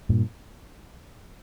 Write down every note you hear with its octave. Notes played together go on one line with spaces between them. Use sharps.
G2 A#2